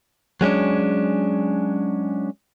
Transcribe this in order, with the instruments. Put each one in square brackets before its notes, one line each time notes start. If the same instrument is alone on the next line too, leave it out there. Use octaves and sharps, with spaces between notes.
[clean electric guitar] F#3 G#3 C#4 D4